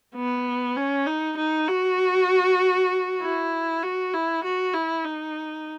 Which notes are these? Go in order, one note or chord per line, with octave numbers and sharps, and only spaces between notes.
B3
C#4
D#4
D#4
F#4
E4
F#4
E4
F#4
E4
D#4